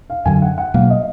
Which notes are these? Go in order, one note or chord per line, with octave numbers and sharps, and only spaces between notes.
F5
F#2 D3 F#3 G#5
F#5
F#5
B2 F#3 A#3 F5
D#5